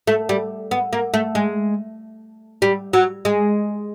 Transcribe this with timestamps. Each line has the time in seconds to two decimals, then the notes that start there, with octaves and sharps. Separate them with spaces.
0.07 A3
0.29 G3
0.71 B3
0.93 A#3
1.14 A3
1.35 G#3
2.62 G3
2.93 F#3
3.25 G#3